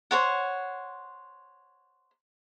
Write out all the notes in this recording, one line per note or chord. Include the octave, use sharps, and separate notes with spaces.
C5 C#5 F#5